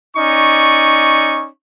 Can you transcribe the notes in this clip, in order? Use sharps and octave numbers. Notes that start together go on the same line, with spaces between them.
C#4 D#4 D5 C#6